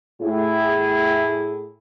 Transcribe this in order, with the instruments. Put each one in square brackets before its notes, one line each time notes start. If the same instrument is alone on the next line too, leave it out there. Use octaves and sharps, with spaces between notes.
[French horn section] A2 E4 G#4